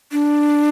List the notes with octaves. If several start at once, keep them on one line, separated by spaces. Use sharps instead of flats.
D4